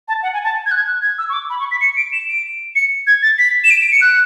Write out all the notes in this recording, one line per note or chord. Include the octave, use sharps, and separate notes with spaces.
A5
F#5
G#5
A5
G#6
F#6
G#6
F#6
G#6
E6
C#6
D6
B5
C#6
B6
C#7
D7
E7
D7
C#7
G#6
A6
B6
E7
D7
D7
C#7
F#6